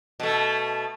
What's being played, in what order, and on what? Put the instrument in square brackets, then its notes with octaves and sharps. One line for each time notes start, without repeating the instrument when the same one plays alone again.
[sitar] B2 A3